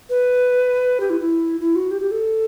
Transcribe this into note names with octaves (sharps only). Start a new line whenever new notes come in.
B4
G4
E4
E4
E4
F#4
G4
G4
A4